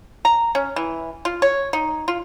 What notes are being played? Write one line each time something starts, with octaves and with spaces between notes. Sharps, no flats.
A#5
C#4
E3
F4
C#5
D#4
F4